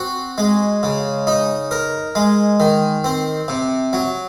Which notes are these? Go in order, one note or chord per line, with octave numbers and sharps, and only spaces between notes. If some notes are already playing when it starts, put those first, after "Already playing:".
Already playing: C4 F#4
G#3
C#3
D#4
A#4
G#3
D#3
C4
C3
F#3